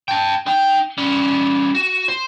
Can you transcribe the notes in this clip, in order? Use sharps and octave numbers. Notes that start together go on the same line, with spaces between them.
G5 A5
D#4 G5
G3 C#4
F#4
C5